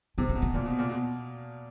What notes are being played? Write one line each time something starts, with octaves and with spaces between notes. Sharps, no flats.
C3 D4
C#4
B2
C4
A#2 B3
B2
A#2
B2